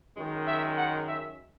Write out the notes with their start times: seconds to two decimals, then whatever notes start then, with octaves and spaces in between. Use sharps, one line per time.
0.17 F#2 D#3 G#3
0.46 E5
0.76 F#5
1.06 E5